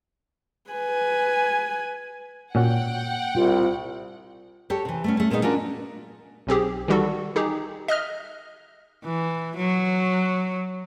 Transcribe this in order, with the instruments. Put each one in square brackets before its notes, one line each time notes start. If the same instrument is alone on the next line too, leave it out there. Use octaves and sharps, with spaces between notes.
[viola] B4 G#5
[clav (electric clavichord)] A#2 C#4 F#4 [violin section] F#5 G5
[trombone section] C2 [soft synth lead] F4
[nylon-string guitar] F#4 G4 A4 C#5
C3 E3
A3 B3 C#4
A3 C#4
A#2 G#3 B3 C4 D#4
C#4 D4 F4 F#4 A#4
[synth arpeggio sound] B1 C4 G4 G#4
D#3 E3 G3 F#4 A4
D#4 G4 G#4
D#5 E5 F6
[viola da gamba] E3
F#3